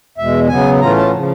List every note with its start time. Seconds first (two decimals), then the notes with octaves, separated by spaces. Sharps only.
0.18 E2 B2 G#3 E5
0.48 C#3 F#3 B3 G#5
0.80 A2 E3 A3 C#4 F4 A#5
0.97 A5
1.13 C#3 F3